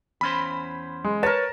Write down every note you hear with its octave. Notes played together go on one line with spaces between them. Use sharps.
E2 C#4 C5 B5
G#3
A#4 B4 C#5 A5